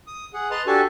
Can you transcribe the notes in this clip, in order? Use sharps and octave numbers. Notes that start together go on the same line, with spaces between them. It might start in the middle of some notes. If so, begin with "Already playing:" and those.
D#6
G#4 F#5
B4 D#5 A5 A#5 C6
D4 F#4 G4 A4 G#5 A5